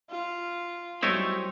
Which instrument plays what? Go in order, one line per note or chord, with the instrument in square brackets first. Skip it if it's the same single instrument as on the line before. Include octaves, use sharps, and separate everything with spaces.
[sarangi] F4
[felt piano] F#3 G3 [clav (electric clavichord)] A3 D#4 E4 [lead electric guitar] C4 C#5